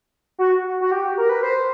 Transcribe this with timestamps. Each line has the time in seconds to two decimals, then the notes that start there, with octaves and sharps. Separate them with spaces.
0.39 F#4
0.81 F#4
0.91 G4
1.17 A#4
1.29 B4
1.43 C5